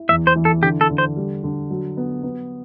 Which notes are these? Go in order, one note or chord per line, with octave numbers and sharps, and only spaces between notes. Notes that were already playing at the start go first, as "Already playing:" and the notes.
Already playing: E4
E2 E5
C5
E3
A4
D3 G4
A4
D3
C5
G3
D3
F#3
B3
B3